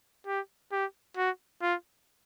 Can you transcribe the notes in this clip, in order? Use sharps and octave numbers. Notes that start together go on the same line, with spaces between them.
G4
G4
F#4
F4